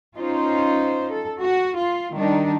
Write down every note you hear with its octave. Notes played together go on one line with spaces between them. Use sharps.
C#4 D#4 F4 C5
A4
F#4
F4
D#3 G3 D4 D#4